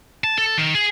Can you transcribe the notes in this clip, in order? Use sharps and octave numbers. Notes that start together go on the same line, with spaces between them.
A5
A4
D#3
G#4